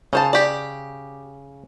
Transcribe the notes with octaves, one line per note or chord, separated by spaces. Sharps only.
C#3 C#4 C5 A5
G4 D5